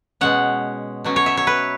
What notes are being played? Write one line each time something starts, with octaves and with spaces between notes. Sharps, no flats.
B2 G#3 C#4 F#5
B2 F#3 C#4
C#5
E5
C#5
B4